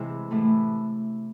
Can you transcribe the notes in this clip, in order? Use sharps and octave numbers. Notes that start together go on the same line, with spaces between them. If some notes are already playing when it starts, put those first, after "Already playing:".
Already playing: C3 E3 G#3 E4 G#4
A2 E3 A3